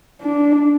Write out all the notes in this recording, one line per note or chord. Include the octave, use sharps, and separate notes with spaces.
D4